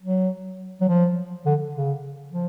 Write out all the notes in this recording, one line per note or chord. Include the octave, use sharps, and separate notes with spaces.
F#3
F#3
F3
D3
C#3
F3